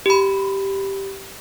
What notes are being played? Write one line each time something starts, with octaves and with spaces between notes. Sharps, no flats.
G4 B5